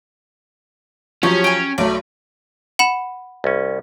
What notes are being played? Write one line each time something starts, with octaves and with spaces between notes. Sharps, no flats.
F3 F#3 C#4 G4 C#5
G5 G#5
B1 F#3 A3 D5
F#5 B5 E7
C2 C#4